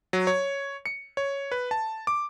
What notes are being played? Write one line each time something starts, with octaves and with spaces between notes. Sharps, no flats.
F#3
C#5
C#7
C#5
B4
A5
D6